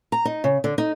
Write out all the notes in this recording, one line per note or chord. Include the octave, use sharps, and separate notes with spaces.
A#5
D#4
C#3
D3
D#4